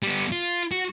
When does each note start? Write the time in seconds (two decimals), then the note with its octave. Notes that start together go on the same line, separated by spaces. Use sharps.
0.03 G3 B3
0.32 F4
0.72 F#4